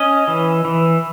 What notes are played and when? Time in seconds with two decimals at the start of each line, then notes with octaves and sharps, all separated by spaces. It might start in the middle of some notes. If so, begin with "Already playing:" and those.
Already playing: C#4 D#5
0.28 E3
0.65 E3